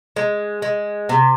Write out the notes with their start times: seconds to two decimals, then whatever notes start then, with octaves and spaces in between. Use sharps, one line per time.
0.16 G#3
0.62 G#3
1.09 C3